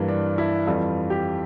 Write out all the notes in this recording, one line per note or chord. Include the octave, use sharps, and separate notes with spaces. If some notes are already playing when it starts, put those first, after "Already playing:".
Already playing: G2 E3 G3 A#3
D4
E4
F2 E3 G3 F4
G4